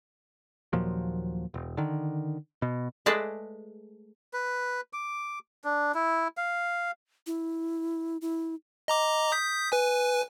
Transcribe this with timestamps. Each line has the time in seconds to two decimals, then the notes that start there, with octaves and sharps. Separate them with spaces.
0.73 D#2 A#2 F3 F#3
1.54 E1
1.77 D3 D#3
2.62 B2
3.06 G#3 A3 G#4 B4 D5 A5
4.33 B4
4.93 D6
5.64 D4
5.94 E4
6.37 F5
7.27 E4
8.22 E4
8.88 D#5 A#5 D6
9.32 D#6 G6 B6
9.72 B4 G#5